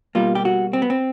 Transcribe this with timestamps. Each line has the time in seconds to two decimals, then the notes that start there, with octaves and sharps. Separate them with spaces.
0.15 B2 G3 A#3 F4
0.35 G4
0.45 F#4
0.73 C4
0.82 B3
0.90 C4